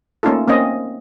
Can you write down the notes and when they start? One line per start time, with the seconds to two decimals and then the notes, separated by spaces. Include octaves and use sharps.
0.23 A3 A#3 C#4 D#4 F4 A4
0.48 A#3 C4 C#4 D#5